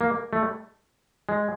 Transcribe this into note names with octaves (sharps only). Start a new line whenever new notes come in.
A#3
A3
G#3